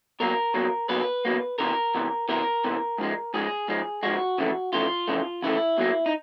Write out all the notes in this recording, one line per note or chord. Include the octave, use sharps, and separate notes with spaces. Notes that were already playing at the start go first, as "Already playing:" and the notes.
B2 F#3 A#3 A#4
B2 F#3 A#3
B2 F#3 A#3 B4
B2 F#3 A#3
E2 C3 E3 A#4
E2 C3 E3
E2 C3 E3 A#4
E2 C3 E3
G#2 F3 G#3
G#2 F3 G#3 G#4
G#2 F3 G#3
G#2 F3 G#3 F#4
F2 C#3 E3 A3
F2 C#3 E3 A3 F4
F2 C#3 E3 A3
F2 C#3 E3 A3 E4
B2 F#3 A#3
D#4